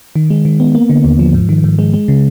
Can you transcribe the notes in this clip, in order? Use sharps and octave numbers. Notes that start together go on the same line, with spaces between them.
D#3
G#3
D#3
B3
A#3
D3
D#2
F3
G#2
D#3
G#2
G#3
G#3
C#3